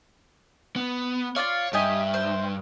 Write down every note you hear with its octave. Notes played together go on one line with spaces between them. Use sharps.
B3
F4 C#5 D5 F5
G2 G4 D#5 E5 G#5
C5